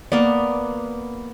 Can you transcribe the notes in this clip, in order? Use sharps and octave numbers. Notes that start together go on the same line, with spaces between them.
A#3 B3 D5